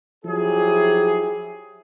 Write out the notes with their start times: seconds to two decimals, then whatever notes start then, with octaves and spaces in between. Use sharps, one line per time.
0.25 F3 F#3 E4 G4 G#4